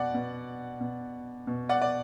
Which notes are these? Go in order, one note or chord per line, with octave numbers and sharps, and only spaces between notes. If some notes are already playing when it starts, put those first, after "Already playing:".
Already playing: B2 D5 F#5
B2
B2
B2
D5 F#5
D5